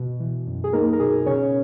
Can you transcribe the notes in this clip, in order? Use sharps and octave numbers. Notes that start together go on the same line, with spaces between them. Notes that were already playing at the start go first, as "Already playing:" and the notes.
Already playing: B2
E3
F#2
G#4
A#3 D#4 A#4
A#4
B2 G#4
C#3 C#4 C#5